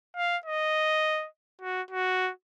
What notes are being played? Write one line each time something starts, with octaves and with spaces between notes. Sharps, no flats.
F5
D#5
F#4
F#4